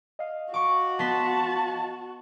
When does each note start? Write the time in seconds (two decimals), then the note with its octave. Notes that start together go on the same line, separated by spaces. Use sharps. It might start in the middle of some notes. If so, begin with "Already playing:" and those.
0.19 D#5 F5
0.54 F#4 C#6 D6
0.99 B3 A5 C6 B6